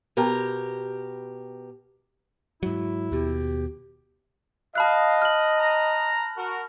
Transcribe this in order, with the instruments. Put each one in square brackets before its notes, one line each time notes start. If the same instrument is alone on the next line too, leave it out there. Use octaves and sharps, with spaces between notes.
[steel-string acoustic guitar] B2 G4 A#4
[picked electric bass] G#2 F#3 [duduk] E4
[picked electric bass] D#2 B2 [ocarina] G4
[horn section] D#5 [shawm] F5 [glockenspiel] A5 B5 F#6
[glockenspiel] F6 F#7
[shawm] A#5
[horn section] F#4 A#4